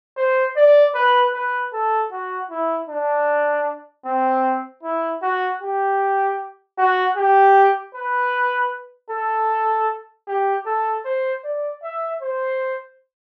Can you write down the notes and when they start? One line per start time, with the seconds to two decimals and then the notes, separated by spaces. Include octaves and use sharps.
0.17 C5
0.57 D5
0.95 B4
1.33 B4
1.73 A4
2.11 F#4
2.50 E4
2.89 D4
4.05 C4
4.83 E4
5.22 F#4
5.62 G4
6.78 F#4
7.17 G4
7.95 B4
9.10 A4
10.27 G4
10.66 A4
11.05 C5
11.44 D5
11.83 E5
12.22 C5